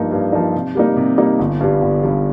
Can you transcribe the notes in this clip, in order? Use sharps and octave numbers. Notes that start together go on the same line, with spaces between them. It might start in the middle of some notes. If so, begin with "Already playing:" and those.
Already playing: G2 F3 A#3 D#4
G2
F3 A#3 D#4
C3
G3 A#3 D#4
C3
G3 A#3 D#4
G1
G2 G3
G1
G2 G3